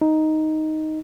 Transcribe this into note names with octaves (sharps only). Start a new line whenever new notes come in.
D#4